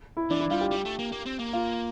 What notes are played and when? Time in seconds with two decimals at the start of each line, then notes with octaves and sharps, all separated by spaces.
0.17 E4
0.30 E3 D4
0.40 E4
0.50 G3 F4
0.61 G4
0.71 G3
0.85 A3
0.99 A#3
1.12 A#3
1.26 C4
1.39 A#3
1.53 F4